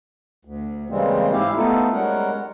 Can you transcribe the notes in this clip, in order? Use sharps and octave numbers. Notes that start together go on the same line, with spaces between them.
D2
C#3 E3 G3 G#3 A#3 C4
G#2 E4 G4 F5
A3 B3 D#4 F4 A4
G3 G#3 C#4 A#4 F#5